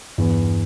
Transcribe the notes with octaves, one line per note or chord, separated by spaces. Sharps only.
E2 G2